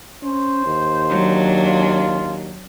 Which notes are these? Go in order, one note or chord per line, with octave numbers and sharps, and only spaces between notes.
C#4 C5
D#2
F#3 D4
F4